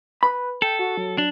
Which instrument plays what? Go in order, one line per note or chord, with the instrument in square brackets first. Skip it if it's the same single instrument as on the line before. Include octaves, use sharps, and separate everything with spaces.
[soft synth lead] B4 [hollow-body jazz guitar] B5
[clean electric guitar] A4 [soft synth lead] G5
[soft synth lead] F#4
F#3
[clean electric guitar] D4